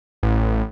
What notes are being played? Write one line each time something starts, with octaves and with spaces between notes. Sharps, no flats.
A1